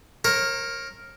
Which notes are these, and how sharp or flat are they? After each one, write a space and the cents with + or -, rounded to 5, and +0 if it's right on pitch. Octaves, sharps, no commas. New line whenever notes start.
A#4 +0 C#5 -40